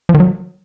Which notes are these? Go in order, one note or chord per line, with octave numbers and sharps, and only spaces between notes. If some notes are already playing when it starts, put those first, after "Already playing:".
F3
D#3
F#3